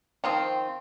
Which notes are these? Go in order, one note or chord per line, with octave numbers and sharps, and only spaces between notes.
D#3 F3 C4